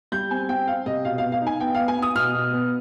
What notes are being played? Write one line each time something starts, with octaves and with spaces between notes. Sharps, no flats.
G3 G6
C4 G#5
C4 G5
C4 F5
C3 D#5
B2 F5
F5
B3
F5
D#4
G#5
B3 G5
B3 F5
G#5
B3 D#6
B2 F6
B2
B3